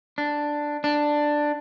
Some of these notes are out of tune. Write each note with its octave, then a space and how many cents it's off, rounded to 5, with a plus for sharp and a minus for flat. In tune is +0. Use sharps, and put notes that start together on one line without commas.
D4 +5
D4 +10